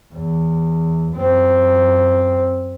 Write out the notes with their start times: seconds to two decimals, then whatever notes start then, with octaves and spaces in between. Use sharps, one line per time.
0.13 E2
1.13 F#2 C4